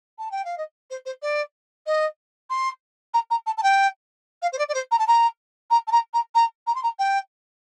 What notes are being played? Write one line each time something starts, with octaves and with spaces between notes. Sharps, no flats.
A5
G5
F5
D#5
C5
C5
D5
D#5
C6
A#5
A#5
A5
A5
G5
F5
C5
D5
D5
C5
A#5
A5
A#5
A#5
A5
A#5
A#5
A#5
A#5
C6
A#5
G5